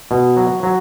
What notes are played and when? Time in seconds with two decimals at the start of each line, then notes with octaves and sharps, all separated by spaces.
0.11 B2
0.37 F#3
0.63 F#3